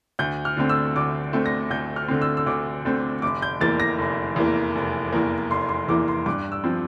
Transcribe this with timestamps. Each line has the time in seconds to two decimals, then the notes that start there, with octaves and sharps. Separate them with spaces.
0.19 D2 G6
0.45 F6
0.57 D3 A3 C4
0.69 E6
0.96 D2 D6
1.33 D3 A3 C4
1.46 A#6
1.70 D2 G6
1.96 F6
2.08 D3 A3 C4
2.22 E6
2.37 E6
2.46 D2 D6
2.85 D3 A3 C4
3.22 F1 D6
3.42 G6
3.61 E2 E3 A#3 A6
3.80 A#6
3.98 F1
4.36 E2 E3 A#3
4.75 F1
5.12 E2 E3 A#3
5.50 F1 C6
5.69 C6
5.88 E2 E3 A#3 D6
6.08 C6
6.26 G2 D6
6.52 E6
6.64 F3 C4